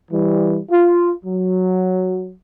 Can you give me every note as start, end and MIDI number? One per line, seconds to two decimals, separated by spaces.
0.12 0.59 52
0.12 0.59 55
0.71 1.13 65
1.25 2.32 54